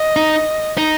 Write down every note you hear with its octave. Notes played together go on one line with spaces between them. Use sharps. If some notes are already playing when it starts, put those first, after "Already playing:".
Already playing: D#5
D#4
D#4